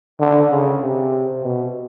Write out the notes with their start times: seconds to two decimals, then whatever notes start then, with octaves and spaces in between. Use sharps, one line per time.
0.20 D3
0.50 C#3
0.82 C3
1.43 B2